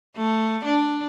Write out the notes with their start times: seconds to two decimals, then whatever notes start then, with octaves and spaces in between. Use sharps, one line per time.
0.16 A3
0.65 D4